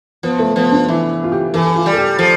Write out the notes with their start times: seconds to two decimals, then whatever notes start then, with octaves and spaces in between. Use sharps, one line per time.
0.23 F3 B3
0.39 A3
0.56 F3 B3
0.72 D4
0.88 E3 E4
1.24 F4
1.32 G4
1.53 E3 A4
1.75 F4
1.86 G3
1.92 A4
1.97 G4
2.19 F3 A4